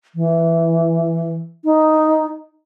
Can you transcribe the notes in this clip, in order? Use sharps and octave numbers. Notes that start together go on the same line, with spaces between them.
E3
D#4